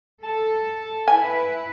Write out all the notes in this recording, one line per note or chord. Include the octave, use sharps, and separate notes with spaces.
A4 A5
E4 B4 G#5